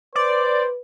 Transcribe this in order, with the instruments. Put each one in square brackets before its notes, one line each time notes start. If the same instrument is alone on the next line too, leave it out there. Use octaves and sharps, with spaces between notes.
[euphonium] B4 [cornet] C5 [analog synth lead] D5